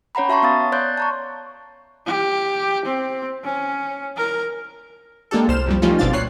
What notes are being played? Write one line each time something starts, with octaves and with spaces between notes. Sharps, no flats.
C#4 C#5 F#5 A#5 B5
F#4 E5 A5 A#5 C6 C#6
B3 F5 D#6 A6
C#5 D5 C6 F#6 G6 A6
A5 A#5 C#6
G4
C4
C#4
A#4
G#3 A#3 D4 G4 A4
C2 C5 F6 E7
C2 F2 G3
F3 G3 A3 C#4 D#4 F4
G1 B2 C4 D4 F5 A6
C2 A#2 C#5 F#6 C7